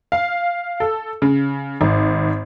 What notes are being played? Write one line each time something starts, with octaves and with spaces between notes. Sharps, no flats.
F5
A4
C#3
G#1